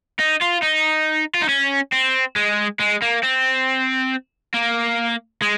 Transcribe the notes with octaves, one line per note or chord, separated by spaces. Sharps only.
D#4
F4
D#4
F4
D#4
C#4
C4
G#3
G#3
A#3
C4
A#3
G#3